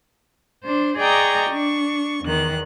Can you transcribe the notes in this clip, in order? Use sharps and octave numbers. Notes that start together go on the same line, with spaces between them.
D4 C5
G#4 D5 D#5 G5 A#5 C#6
D4 C#6
E2 D#3 F#6